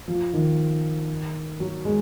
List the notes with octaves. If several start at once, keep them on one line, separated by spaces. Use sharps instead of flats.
F3
D#3
F#3
G#3